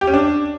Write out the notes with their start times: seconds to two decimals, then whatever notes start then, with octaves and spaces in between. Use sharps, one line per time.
0.01 G4
0.07 C#4
0.14 D4